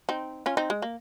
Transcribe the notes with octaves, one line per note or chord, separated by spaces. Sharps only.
C4 D#4
C#4 F4
C4 D#4
G#3
A#3